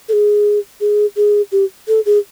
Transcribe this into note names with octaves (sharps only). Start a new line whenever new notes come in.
A4
G#4
G#4
G#4
G4
A4
G#4